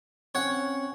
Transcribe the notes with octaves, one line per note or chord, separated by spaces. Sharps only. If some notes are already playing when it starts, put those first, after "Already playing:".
C4 C#4 C#5 F#5